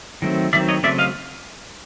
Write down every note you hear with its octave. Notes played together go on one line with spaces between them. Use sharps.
D#3 F#3 A3 C4
D#3 F#3 A3 C4 D5 E5
C#5 D#5
C#3 F#3 A3 C4 D5 E5
D#5 F5